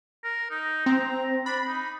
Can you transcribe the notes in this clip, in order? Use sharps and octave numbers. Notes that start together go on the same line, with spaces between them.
A#4
D#4
C4 A#5
D4 B5
D#4